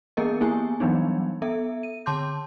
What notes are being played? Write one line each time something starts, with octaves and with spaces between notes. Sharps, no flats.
E3 A#3 B3 G#4 A#4 D#5
A#3 B3 E4 G4 G#4 G#5
E3 F#3 G3 B3 D4 D#4
B3 A4 E5
D#7
D3 A5 C6 D6 G6